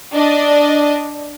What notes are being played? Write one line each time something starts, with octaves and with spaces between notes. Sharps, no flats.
D4 D#5